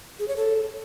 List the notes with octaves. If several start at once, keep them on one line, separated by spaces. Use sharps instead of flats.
G#4
C#5
A4